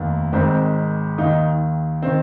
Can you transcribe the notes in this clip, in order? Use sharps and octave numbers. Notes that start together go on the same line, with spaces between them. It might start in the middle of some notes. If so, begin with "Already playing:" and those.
Already playing: F1 D#2 D#3
G#1 G#2 D#3 C4
D#2 D#3 D#4
D#3 C4